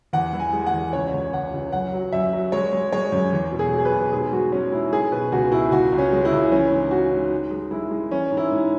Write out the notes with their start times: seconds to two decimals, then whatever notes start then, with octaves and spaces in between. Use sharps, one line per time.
0.13 E2 F#5
0.33 E3
0.40 G#5
0.53 G#3
0.66 F#5
0.73 E2
0.93 C#2 C#5
1.13 C#2
1.33 C#2 F#5
1.53 C#2
1.72 F#2 F#5
1.93 F#3
2.12 F#2 E5
2.33 F#3
2.52 G#3 C#5
2.73 G#3
2.92 G#3 C#5
3.12 F#2
3.33 E2
3.52 B2
3.59 G#4
3.72 F#3
3.78 G#4
3.85 B4
3.92 B2
4.12 G#2 G#4
4.32 G#3 F#4
4.52 G#3 C#4
4.72 G#2 E4
4.92 G#3 G#4
5.11 B2 B4
5.32 C#2 F#4
5.52 B2 E4
5.72 C#2 F#4
5.92 C#2
5.98 C#4
6.12 G#3
6.25 E4
6.32 C#2
6.51 E3 C#4
6.71 G#2
6.91 G#2 F#4
7.12 G#2
7.32 G#2
7.51 G#3
7.71 G#3 E4
7.91 G#3
8.11 E3 C#4
8.31 G#2
8.37 E4
8.51 G#2